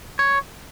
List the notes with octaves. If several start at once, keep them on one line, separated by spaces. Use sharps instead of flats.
C#5